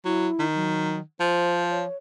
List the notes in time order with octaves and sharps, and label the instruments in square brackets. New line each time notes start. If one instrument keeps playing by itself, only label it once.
[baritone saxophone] F#3 [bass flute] E4
[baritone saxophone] D#3
[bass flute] F#3
[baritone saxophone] F3 [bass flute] C5
[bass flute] C#5